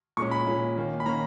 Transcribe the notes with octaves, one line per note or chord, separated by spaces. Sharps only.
A#2 G#3 C#4 C#6
B5
A#2 G#3 C#4
D#3 A#3 C#4
B5
D#3 A#3 C#4 A#5